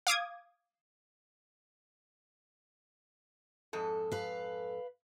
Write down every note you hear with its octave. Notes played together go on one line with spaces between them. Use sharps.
F5 D6 D#6 G#6
F2 G#2 A4
B4 F5